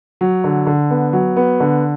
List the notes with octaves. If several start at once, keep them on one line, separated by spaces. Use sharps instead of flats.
F#3
D3
D3
B3
F#3
B3
D3